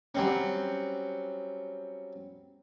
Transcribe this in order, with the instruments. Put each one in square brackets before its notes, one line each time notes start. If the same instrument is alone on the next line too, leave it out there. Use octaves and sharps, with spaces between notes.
[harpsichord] F#3 G3 C4 C#4